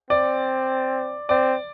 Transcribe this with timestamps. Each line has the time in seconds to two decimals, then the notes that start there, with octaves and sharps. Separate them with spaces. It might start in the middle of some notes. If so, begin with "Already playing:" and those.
0.10 C4 D5
1.29 C4 D5